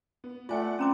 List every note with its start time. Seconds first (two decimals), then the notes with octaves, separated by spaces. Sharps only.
0.24 B3
0.49 A3 F4 D5 E5 F#5 G#5
0.79 C4 C#4 A#5 D6